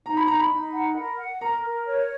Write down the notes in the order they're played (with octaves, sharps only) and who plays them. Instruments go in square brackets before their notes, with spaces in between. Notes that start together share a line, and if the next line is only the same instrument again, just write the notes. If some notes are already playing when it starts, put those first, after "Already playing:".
[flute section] D#4 [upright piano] A#5
[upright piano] B5
[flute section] D#4 [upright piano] A#5
[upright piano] B5
[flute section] D#4
F#5
A#4
F#5
[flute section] A#4 [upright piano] A#5
[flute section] A#4
C#5